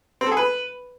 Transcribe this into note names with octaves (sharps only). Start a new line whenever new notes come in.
C4
A4
G#4
B4